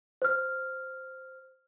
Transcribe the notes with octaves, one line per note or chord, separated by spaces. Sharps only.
C5 F6